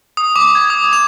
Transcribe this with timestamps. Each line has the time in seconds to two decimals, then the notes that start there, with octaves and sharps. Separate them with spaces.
0.17 D#6
0.36 D6
0.55 G#6
0.70 D#6
0.93 F7